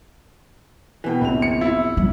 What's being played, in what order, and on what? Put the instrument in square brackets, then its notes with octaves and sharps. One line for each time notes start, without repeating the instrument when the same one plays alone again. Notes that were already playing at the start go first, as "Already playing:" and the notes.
[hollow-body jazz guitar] B2 E3 [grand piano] B4 G5
[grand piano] A#1 C4 F7
[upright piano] C#7
E4
[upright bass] G3